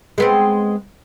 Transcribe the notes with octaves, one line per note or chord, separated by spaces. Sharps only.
G#3 B3 C4